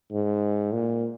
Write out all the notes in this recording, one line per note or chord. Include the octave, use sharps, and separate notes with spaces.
G#2
A#2